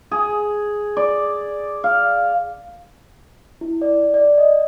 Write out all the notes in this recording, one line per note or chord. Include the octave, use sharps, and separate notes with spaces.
G#4
D5
F5
E4
D5
D5
D#5